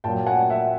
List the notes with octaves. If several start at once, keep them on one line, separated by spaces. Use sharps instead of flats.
A#2 F#3 G5 A5
F#5 G#5
E5 F#5